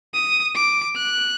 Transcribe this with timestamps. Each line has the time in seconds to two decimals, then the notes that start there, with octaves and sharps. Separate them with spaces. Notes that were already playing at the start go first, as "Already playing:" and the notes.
0.14 D#6
0.55 D6
0.96 F#6